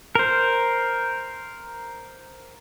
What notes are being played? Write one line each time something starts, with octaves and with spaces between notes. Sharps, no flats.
A#4 C5